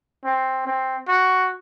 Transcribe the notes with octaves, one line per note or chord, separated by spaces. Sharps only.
C4
C4
F#4